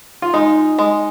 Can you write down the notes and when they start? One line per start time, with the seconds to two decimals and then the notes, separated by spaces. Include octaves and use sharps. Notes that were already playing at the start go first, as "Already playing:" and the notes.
0.22 F4
0.34 G#3 D#4
0.79 G#3